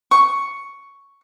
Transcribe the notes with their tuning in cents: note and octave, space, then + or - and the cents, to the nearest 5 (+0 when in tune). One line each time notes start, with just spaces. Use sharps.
C#6 +5